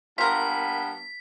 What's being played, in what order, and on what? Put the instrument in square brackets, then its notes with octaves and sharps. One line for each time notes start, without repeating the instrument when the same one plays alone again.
[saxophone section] G2 A#3 B3 [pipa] F4 A#4 [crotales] B6